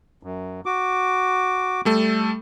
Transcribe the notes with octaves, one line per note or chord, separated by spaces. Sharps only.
F#2
F#4 D6
G3 A3 A4